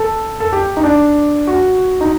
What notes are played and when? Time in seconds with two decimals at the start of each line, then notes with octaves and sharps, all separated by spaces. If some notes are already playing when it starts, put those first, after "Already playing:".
Already playing: A4
0.40 A4
0.53 G4
0.77 D#4
0.83 D4
1.47 F#4
2.01 D#4